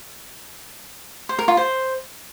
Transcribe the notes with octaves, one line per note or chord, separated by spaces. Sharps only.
C5
A#4
F4
C5